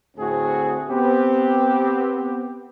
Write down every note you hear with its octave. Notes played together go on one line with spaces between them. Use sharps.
D2 A2 A3 C4 F#4 G#4
B3 C4 G4